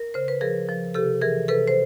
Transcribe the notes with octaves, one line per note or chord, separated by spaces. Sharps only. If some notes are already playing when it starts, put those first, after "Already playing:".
Already playing: A#4
C#3 C5
B4
F3 G#4 A#4
F3
C3 G4 A4
E3 G#4 A#4
C3 A4 B4
C5